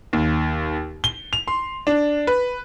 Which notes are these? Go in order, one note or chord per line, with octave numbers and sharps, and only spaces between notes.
D#2
G7
F7
C6
D4
B4